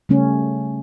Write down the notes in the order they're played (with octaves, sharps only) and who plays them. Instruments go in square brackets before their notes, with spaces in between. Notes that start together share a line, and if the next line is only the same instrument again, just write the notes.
[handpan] C#3 G3 A3 C#4